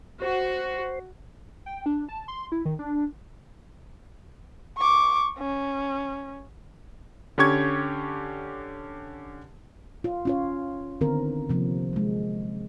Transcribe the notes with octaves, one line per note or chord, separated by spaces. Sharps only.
F#4 C5
G5
D4
A5
C6
E4
D#3
D4
C#6 D6
C#4
D3 C#4 G4 C#6 G#6
F4
C#4 F4 C#5
D3 D#3 B3 C4 A#4
C3 F3 A#3
F#3 G#3